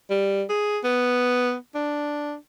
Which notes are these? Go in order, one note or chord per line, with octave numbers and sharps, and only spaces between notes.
G3
G#4
B3
D4